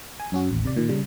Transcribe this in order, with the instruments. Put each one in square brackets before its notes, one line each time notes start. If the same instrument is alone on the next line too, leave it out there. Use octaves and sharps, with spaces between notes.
[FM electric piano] G#5
F#2 C#4 F#4
A1 D#2
C3 D5
A#2 D#3
C#3 G3